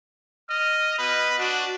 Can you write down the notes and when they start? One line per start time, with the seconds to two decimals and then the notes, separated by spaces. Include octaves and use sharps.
0.50 D#5 F6
0.99 B4 D#5 B5
1.39 D4 F#4